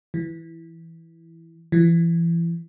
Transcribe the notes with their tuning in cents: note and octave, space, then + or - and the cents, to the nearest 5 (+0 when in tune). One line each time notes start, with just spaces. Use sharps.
E3 +0
E3 +30